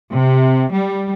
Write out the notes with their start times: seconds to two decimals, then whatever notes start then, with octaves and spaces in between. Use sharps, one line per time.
0.12 C3
0.71 G3